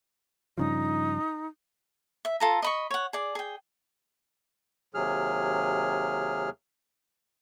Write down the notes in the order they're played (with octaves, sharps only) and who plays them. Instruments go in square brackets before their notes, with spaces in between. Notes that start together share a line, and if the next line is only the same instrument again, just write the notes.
[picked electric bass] G2 C#3 F3 [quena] D#4
[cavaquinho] E5
F4 A4 A#5
D#5 B5 C#6
C#5 F#5
G#4 D5
G#4 G5
[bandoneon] D#2 C3 F#3 G#4 F6